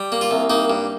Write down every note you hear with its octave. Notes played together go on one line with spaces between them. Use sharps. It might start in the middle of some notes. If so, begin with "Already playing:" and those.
Already playing: G3
A#3
F4
C2
A#3 D#4
G2